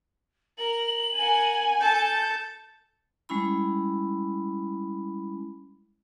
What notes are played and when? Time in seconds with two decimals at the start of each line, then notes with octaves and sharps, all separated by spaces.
0.58 A#4 F#7
1.16 A#4 F#5 G#5
1.80 A4 A5 G6
3.29 G3 G#3 C#4 E4 B5